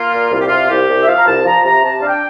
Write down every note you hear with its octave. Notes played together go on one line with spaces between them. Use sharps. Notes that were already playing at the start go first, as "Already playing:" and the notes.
Already playing: A#3 F4
A#2
C2 F4
G4
C3 F4
C2 G4
C2
E5
F3 F5
A#5
C2 A5
F3 A#5
C3 A#5
C3 A5
D4 F5
G5